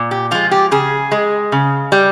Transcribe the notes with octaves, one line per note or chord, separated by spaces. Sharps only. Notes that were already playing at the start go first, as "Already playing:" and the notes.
Already playing: A#2
G4
F3 G#3 F4
G4
C#3 G#4
G#3
C#3
G3